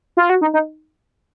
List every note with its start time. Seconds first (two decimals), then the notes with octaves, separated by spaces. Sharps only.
0.17 F4
0.30 F#4
0.41 D#4
0.54 D#4